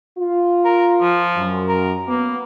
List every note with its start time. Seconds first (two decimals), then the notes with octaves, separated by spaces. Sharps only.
0.18 F4
0.65 A#4
1.01 F3
1.37 F#2
1.68 A#4
2.08 A#3 B3